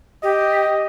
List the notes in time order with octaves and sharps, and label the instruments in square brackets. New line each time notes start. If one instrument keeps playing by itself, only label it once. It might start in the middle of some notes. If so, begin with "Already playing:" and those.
[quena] G4 [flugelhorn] D#5